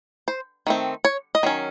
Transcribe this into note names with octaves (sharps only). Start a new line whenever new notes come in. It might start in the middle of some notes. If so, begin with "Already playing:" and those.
C5
D#3 A3 C4
C#5
D#5
D#3 F#3 C#4